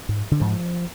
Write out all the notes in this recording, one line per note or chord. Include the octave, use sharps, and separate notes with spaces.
G#2
D3
G#2 F3